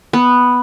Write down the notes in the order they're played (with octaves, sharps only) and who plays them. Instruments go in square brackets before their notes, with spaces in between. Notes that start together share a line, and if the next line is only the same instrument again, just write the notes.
[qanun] B3